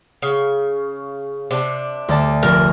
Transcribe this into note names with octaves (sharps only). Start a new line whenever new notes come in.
C#3
C3 D4
D2 D5 A5
F1 A#4